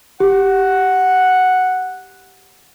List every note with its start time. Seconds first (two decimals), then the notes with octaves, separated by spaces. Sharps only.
0.20 G4 F#5